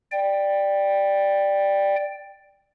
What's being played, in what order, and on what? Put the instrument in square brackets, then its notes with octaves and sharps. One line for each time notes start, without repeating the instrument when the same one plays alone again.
[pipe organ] D5 G5